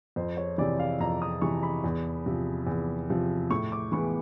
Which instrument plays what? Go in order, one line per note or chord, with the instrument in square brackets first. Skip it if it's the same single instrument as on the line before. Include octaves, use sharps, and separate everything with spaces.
[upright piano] F2 C5
C#5
C3 E3 D5
F5
F2 A#5
D#6
C3 E3 C#6
B5
E2
C3 F3
E2
C3 F3
A2 C#6
D6
E3 G#3 B3 C#6